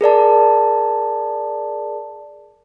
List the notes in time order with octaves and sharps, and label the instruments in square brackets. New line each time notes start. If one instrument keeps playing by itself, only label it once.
[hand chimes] G#4 A#4 D5 A5